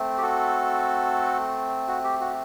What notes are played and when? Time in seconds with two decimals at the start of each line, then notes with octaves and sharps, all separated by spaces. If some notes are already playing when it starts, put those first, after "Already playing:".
Already playing: A3 C4
0.18 G4
0.22 F#4 A4
1.88 F#4
2.04 G4
2.21 F#4